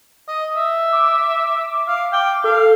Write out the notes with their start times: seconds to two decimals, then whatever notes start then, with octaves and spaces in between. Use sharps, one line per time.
0.28 D#5
0.56 E5
0.92 D6
1.88 F5
2.12 G5
2.44 A4 F5